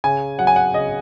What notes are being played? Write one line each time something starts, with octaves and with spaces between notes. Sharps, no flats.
C#3 G#5
F#3 F#5
G#5
F#5
C#3 D#5